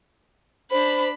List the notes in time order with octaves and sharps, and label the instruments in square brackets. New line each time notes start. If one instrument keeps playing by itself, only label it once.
[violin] D4 B5 [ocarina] C5